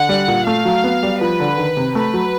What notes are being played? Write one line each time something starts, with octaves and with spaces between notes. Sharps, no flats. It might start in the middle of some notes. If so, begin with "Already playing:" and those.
Already playing: D3 F#5
G3
A#2
A3 F5
F#3
B3
G3
F3 B4
D3
D#3
C3
A3 B4
F#3